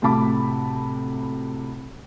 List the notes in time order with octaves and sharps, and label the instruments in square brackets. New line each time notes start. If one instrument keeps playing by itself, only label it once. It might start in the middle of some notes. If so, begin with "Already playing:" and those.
[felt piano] A2 C3 F#4 A5 B5 D6